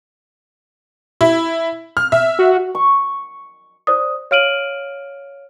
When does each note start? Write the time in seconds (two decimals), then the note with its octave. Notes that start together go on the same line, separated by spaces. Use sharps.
1.21 E4
1.97 F6
2.12 E5
2.39 F#4
2.75 C#6
3.87 C5 D5 D#6
4.31 C#5 F5 F6 D7 D#7 F#7